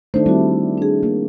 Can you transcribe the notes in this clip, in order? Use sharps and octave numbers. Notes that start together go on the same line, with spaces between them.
D#3 A3 D4 D#4 C5
G3 C4 E4 F#4
D4 G#4
A#3